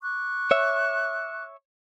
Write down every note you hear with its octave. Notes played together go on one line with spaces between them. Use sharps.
C#6 D6 F#6
C#5 E5